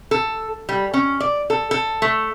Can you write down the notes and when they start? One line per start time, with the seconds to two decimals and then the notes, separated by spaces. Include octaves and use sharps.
0.11 A4
0.69 G3
0.94 C#4
1.20 D5
1.50 A4
1.71 A4
2.02 A3